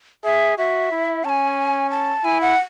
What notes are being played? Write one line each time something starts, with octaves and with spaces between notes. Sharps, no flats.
G#4 E5
F#4 E5
E4
C#4 G#5 A5
A5
E4 G#5
F#5